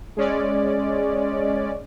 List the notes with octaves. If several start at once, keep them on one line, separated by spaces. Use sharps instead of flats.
G#3 C#4 D5